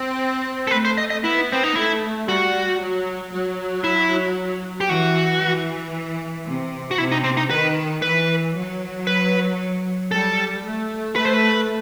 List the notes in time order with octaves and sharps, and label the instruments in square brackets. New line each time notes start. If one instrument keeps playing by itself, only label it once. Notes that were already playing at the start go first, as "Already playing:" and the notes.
Already playing: [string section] C4
[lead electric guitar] A4
[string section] A3 [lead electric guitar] B4
[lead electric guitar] C5
D#5
D#5
[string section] B3 [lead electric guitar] E4
[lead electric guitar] C4
D#4
[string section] A3 [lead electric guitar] E4
[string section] G3 [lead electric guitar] F#4
[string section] F#3
F#3
[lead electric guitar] E4
G4
[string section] E3 [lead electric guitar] F#4
[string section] E3
C3
[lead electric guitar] F#4
[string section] C3 [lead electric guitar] E4
[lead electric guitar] D#4
C4
D#4
[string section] D#3 [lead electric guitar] B4
[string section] E3 [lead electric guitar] B4
[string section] F#3
[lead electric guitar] B4
[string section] G3 [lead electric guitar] A4
[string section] A3
[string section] A3 [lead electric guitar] B4
[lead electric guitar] C5
B4